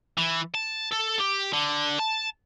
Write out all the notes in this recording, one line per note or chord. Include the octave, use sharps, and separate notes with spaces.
E3
A5
A4
G4
D3
A5